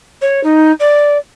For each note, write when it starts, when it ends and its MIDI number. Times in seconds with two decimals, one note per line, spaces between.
0.21 0.40 73
0.43 0.72 63
0.79 1.17 74